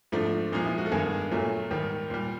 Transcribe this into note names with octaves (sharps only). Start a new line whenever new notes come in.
G#2 F3 A3 D4
A#2 F3 G#3 D#4
E4
F#4
A4
G2 D#3 G#3 G#4
A#2 F#3 A3
G#2 D#3 G3 G4
A#2 G3